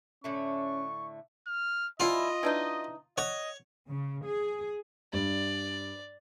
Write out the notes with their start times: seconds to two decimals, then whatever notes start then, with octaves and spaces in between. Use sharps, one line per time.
0.24 A2 D3 A3 C#4 C#6
1.47 F6
2.00 F3 G3 E4 F4 D#5
2.43 E3 D4 D#4
3.18 C#5 D#5 F#5
3.88 C#3
4.26 G#4
5.13 G2 D5